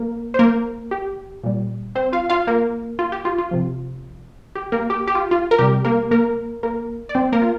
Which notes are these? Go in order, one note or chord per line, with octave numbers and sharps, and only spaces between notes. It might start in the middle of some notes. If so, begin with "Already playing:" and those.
Already playing: A#3 A#4
C5
A#3 A#4
G4
A#2 G3
C4 C5
F4 F5
F4 F5
A#3 A#4
F4
G4
F4
F4
C3 F3
G4
A#3 A#4
G4
G4
F4
F4
A#4
C3 G3 G4
A#3 A#4
A#3 A#4
A#3 A#4
D5
C4 C5
A#3 A#4
F4